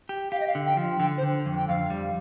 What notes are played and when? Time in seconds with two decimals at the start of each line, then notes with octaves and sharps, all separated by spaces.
0.09 G4
0.32 G4 F5
0.40 D#5
0.47 F5
0.55 D3
0.66 G5
0.77 F3
1.00 D3 G5
1.17 C5
1.23 D3
1.46 F2
1.56 G5
1.68 F2 F5
1.90 G3